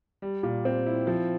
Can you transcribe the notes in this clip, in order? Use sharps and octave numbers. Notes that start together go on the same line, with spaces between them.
G3
A#2
C4
E4
F3